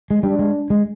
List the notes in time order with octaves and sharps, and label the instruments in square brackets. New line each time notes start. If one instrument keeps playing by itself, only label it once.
[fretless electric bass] G#3
[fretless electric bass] G3 [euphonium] D4
[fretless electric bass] G#3
G#3